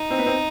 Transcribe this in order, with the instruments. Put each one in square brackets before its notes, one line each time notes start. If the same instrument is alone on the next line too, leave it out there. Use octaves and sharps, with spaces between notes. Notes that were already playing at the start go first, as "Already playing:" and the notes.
Already playing: [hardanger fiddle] D#4
[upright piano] C4
B3
C4